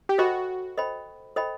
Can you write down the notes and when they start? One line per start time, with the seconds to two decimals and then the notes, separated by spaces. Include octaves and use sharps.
0.09 G4
0.18 F#4 A4 C5 D#5 G5 B5
0.77 A4 C5 D#5 G5 B5
1.36 A4 C5 D#5 G5 B5